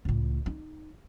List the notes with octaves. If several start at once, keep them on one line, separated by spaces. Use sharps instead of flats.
C#2 A2
D#4